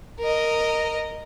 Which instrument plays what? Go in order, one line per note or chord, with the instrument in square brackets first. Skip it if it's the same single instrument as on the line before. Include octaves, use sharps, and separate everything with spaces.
[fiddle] A#4 D#5